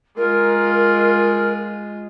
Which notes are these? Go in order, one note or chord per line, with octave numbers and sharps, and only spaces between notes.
G#3 F4 A#4